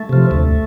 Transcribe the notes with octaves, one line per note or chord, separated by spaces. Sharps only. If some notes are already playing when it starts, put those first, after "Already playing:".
Already playing: A3
C3 F3
D2